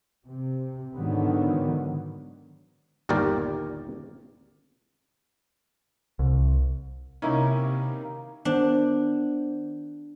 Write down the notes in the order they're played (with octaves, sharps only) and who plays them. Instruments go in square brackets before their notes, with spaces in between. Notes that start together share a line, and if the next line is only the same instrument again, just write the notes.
[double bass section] C3
G#2 D3 D#3 F#3 B3
[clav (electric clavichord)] G1 D#2 A#2 G4 A#4 D5
[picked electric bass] C2
[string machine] C3 [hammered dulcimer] D#3 A#3 [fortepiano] C#4 D#4 E4
[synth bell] D#3 B3 C5 [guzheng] D4